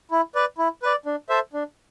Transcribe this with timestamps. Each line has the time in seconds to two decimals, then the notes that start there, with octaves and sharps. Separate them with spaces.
0.11 E4
0.35 B4 D5
0.58 E4
0.83 B4 D5
1.06 D4
1.29 A4 C5 E5
1.53 D4